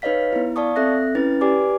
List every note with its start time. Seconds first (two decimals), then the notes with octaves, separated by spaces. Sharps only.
0.02 D#4 B4 C#5 D#5 F5 B6
0.33 B3 E4
0.56 D5 F5 A5 C#6 D#6
0.76 C4 A4 E5 F#6 A#6
1.15 C#4 E4 B4 A6
1.41 G4 B4 D5 G#5 D6